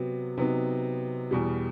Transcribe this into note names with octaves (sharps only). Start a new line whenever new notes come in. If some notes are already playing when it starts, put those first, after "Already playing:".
Already playing: C3 F#3 B3
C3 F#3 B3 D#4
E2 B2 G3